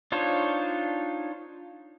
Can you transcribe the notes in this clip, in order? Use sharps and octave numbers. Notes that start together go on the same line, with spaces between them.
D4 D#4 F4 C5 C#5